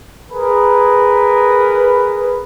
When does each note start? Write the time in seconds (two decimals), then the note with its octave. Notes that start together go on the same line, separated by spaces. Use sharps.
0.30 G#4 A#4 B4